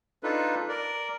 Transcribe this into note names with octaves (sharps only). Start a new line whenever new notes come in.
D4 D#4 F4 A4 B4
A#4 D5